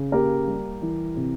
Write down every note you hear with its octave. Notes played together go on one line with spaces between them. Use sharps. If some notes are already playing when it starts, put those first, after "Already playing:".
Already playing: C#3
A#3 G4 A#4
G3
E3
C3